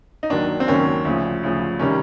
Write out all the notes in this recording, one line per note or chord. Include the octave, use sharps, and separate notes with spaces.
D#4
D#2 D#3 F#3 D4
C4
D#2 D#3 F#3 C#4
D2 C#3 F3
D2 C#3 F3
C3 D#3 G3 C#4